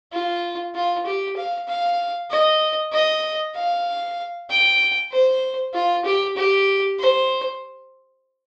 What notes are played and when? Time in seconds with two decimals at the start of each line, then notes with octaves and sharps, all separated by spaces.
0.12 F4
0.75 F4
1.06 G4
1.36 F5
1.67 F5
2.30 D#5
2.92 D#5
3.56 F5
4.50 G5
5.11 C5
5.74 F4
6.05 G4
6.37 G4
6.99 C5